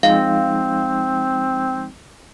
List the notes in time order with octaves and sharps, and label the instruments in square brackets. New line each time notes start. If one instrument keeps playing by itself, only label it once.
[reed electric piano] F3 G#3 D#4 [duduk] C4 [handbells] F5